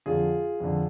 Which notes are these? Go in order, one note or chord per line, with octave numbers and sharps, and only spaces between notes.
F2 D3 F4 G#4
F2 D3